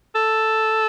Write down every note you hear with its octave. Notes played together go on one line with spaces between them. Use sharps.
A4